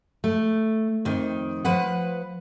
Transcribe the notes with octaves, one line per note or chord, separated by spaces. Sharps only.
A3
F2 D#3
F3 B4 F#5